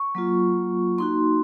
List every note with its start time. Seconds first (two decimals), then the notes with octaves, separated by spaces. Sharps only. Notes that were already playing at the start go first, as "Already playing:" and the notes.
Already playing: C#6
0.15 F#3 A#3 F4
0.98 A#3 D#4 F#4 C6